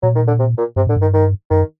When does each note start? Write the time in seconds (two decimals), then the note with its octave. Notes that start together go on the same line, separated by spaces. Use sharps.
0.03 A#2 F#3
0.15 D#3
0.28 D3
0.39 C3
0.58 A#2
0.76 G2 C3
0.87 A2 D3
0.96 G2 D#3
1.13 D#3
1.50 F#2 D#3